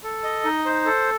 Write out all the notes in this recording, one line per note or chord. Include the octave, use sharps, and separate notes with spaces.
A4
D#5
D#4
C5
A4